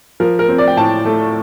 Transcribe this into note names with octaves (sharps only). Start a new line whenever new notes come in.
F3 A#4
A#4
C4
D5
G5
A2 A5
A3